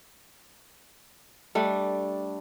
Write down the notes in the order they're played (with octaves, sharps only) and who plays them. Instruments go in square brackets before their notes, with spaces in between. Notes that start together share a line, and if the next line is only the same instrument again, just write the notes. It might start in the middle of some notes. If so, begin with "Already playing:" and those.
[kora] G3 A3 D4